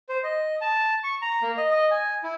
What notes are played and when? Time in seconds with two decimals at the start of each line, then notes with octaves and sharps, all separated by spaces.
0.09 C5
0.23 D#5
0.61 A5
1.04 C#6
1.22 A#5
1.42 A#3
1.57 D#5
1.71 D#5
1.91 G#5
2.23 E4